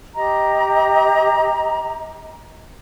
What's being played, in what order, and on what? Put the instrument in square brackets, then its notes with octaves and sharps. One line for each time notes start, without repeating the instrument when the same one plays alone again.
[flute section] G4 D#5 A#5